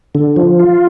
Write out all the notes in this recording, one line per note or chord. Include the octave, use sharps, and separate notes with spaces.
D3
F3
F4